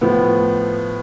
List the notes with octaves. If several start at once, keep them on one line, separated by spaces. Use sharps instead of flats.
A2 F3 B3